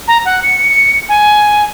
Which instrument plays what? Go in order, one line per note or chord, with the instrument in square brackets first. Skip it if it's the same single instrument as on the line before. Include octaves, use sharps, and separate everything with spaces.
[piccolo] A#5
F#5
C#7
G#5